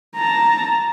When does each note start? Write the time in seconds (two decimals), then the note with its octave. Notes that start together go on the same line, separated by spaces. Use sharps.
0.16 A5 A#5